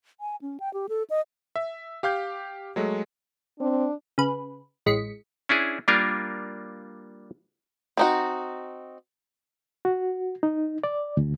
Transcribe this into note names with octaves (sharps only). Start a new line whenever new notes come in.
G#5
C#4
G5
G4
A4
D#5
E5
G4 F5 D6 G6
F#3 G#3 A3
C4 D4
C#3 B4
A1 G#3 B6 C#7
C#4 D4 E4 G#4
G3 A#3 D4 F4 A#4
C4 D#4 F#4
F#4
D#4
D5
D2